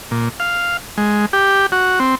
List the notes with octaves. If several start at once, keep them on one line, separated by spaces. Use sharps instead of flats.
A#2
F5
G#3
G4
F#4
C4